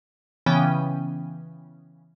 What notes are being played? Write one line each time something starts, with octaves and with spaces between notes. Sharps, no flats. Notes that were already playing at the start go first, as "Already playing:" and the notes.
C#3 E3 B3 C#4 G5 D#7